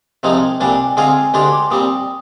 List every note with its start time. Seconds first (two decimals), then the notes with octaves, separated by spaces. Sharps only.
0.23 C2 C3 F3 G#3 D#4 G5
0.60 C2 A#2 G3 D4 G#5
0.97 D3 G#3 C4 F4 G#4 G#5
1.34 D2 D3 G#3 D4 G4 C6
1.53 D6
1.71 A#2 G3 C4 D#6